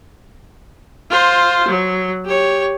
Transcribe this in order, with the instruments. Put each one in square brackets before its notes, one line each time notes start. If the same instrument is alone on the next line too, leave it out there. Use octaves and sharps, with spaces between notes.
[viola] F4 C5
F#3
G4 C#5